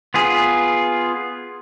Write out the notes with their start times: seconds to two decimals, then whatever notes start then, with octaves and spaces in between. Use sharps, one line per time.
0.14 B3 F4 G#4